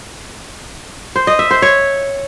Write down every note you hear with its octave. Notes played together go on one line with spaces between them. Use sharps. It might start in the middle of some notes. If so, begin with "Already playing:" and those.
C5
D#5
E5
C5
C#5